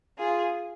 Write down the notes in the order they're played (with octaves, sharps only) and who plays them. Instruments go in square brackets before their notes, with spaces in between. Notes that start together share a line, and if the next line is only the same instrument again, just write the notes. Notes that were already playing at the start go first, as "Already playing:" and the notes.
[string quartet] F4 G#4